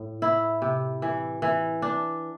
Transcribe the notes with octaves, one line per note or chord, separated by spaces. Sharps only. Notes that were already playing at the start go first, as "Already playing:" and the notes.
Already playing: A2
E4
C3
E3
E3
D4